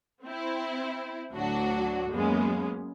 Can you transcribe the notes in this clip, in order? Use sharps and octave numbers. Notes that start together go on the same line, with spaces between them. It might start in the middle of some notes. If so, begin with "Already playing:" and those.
C4 E4
D2 A2 F#3 D4 F#4
F#2 G#3 A#3 B3 C#4